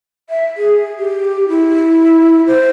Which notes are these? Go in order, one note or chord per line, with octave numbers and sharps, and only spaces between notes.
E5
G#4
G4
E4
C5